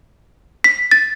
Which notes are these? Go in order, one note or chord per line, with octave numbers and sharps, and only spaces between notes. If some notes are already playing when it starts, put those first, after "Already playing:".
B6
A6